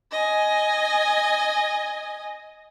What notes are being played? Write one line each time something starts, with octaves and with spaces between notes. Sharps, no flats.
D#5 G#5